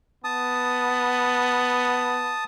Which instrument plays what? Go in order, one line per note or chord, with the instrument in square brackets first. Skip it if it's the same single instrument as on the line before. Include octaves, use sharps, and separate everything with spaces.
[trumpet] B3 [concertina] A5 D#6